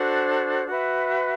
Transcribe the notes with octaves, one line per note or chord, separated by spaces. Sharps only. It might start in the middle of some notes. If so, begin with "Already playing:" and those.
Already playing: D4 F#4 A4 C5
F#4 B4 E5